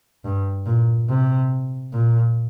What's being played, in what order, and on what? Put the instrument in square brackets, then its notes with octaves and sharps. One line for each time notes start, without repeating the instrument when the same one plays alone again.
[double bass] G2
A#2
C3
A#2